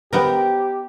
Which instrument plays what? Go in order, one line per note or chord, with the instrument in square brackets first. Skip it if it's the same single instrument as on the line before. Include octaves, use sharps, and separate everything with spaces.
[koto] B3 D#4 A#4 [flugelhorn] G4 [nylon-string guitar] C5 G5